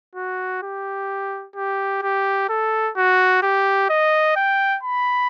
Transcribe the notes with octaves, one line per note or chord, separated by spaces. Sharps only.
F#4
G4
G4
G4
A4
F#4
G4
D#5
G5
B5